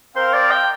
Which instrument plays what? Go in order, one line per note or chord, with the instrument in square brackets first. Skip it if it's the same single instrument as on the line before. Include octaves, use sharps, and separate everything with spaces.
[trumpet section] C4 A#4 F5 [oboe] C5
[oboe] D5
G5